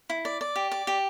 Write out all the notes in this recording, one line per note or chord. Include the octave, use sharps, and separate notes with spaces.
E4
D5
D5
G4
D5
G4